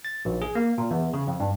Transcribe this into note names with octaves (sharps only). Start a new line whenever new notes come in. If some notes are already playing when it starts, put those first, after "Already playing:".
A6
A#1
G#4
A#3
A#2
E2
C#3
F2
G2